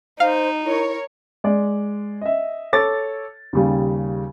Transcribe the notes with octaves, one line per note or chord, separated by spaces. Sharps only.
D#4 C5 F5
E4 A#4 C#5
G#3 D5
D#5 E5
A4 C#5 D6 A6
D#2 C#3 G3